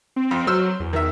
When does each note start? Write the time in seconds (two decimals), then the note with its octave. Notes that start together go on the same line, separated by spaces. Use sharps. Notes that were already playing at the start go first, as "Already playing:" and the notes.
0.16 C4
0.31 F2
0.47 F#3 C5 E6 F6
0.80 E2
0.93 D#3 E5